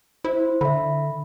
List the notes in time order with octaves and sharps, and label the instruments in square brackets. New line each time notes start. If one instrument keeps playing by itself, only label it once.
[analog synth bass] E4 [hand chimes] C5
[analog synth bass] D3 [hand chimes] E5 B5